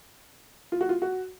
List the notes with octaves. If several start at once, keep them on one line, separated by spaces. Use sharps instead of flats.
F4
F#4
F4
F#4